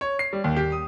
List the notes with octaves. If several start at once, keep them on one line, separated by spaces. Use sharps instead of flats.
C#5
C7
G3
D#2
G4
D#6